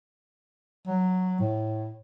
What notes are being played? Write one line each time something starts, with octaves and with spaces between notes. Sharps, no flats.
F#3
A2